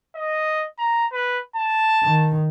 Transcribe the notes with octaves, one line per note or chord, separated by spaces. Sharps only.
D#5
A#5
B4
A5
D#3